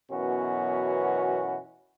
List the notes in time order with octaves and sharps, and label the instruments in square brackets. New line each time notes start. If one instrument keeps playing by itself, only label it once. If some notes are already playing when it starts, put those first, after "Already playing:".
[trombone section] F#2 B2 E3 B3 C#4 F#4